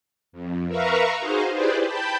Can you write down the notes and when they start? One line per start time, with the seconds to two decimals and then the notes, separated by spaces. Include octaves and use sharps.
0.32 F2
0.68 A#4 B4 E5 F5 A#5 C#6
1.20 D#4 F#4 G#4 C5 D#5 F5
1.52 E4 G4 G#4 B4 C5 D5
1.84 G5 A5 B5 G6